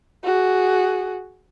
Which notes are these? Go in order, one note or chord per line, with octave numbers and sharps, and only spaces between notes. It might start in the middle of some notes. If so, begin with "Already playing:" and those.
F#4 G#4